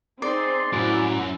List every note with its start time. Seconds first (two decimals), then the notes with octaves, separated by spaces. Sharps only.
0.22 C4 D#4 G#4 D5 C6
0.73 F#2 A2 E4 F#4 D6